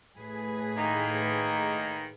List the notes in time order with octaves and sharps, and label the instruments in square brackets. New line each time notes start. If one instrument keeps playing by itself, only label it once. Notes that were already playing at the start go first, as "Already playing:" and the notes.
[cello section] A2 G#4 B4
[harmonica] D#3 A#3 D#4